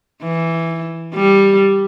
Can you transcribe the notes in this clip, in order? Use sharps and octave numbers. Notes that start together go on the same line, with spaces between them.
E3
G3